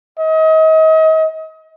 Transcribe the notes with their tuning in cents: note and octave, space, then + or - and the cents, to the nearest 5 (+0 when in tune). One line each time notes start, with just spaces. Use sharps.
D#5 +35